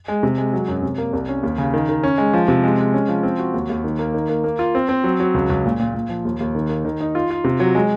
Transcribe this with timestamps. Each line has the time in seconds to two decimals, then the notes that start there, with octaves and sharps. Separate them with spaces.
0.08 G#3
0.23 C3
0.38 G#3
0.53 F#3
0.68 F#2
0.82 C3
0.98 A#3
1.13 C2
1.29 C#4
1.43 D#2
1.58 C#3
1.74 D#3
1.89 D#3
2.03 C#4
2.18 G#3
2.33 F3
2.48 C3
2.63 G#3
2.78 G#3
2.94 C#4
3.08 F3
3.23 C4
3.39 F#4
3.54 D#2
3.69 D#2
3.84 D#3
3.99 A#3
4.14 D#3
4.29 A#3
4.44 A#3
4.59 F4
4.75 C4
4.89 C4
5.04 F#3
5.20 F#3
5.34 C#2
5.50 C#2
5.65 A#2
5.80 A#2
5.94 A#2
6.09 F3
6.25 D#2
6.40 D#2
6.55 D#3
6.69 A#3
6.85 D#3
7.00 D#4
7.15 F4
7.31 F4
7.44 C3
7.60 F#3
7.75 G#3